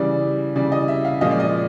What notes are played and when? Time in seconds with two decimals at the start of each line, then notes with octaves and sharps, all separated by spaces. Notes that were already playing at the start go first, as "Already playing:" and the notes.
Already playing: C#3 E3 G3 D5
0.56 C#3 E3 G3 D5
0.72 D#5
0.88 E5
1.05 F5
1.21 A#2 F3 G#3 C#4 F4 D#5
1.31 D5
1.40 D#5